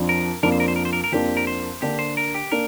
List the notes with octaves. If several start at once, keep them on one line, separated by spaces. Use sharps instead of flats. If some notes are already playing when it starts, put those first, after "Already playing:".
Already playing: F2 F3 D4
A#4
F2 F3 A#3 D4 A#4
C5
A#4
C5
A#4
C5
A#4
A#4
F2 F3 A#3 D4 G4
A#4
C5
D3 A#3 D4 G4
C5
A#4
G4
A#3 D4 A#4